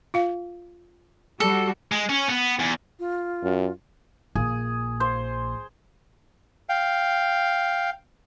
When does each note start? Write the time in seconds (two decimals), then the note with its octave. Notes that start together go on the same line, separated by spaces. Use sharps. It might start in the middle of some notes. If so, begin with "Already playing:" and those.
0.14 F4 F5
1.40 G3 F#4 A4
1.92 G#3
2.09 C#4
2.29 B3
2.59 E2
2.99 F4
3.43 F#2
4.35 A#1 G#4
5.00 C5
6.69 F5 G5